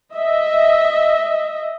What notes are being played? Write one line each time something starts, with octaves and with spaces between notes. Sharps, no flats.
D#5 E5